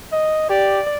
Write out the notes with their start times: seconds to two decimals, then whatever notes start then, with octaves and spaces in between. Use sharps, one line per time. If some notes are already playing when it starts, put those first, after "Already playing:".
0.12 D#5
0.50 G4 D5